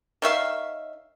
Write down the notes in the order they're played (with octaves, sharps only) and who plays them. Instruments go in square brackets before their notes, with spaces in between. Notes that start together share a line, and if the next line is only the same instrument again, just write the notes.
[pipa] D#3 C#5 E5 F5